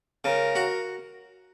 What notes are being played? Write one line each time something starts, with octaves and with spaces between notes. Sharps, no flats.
C#3 A#4
F#4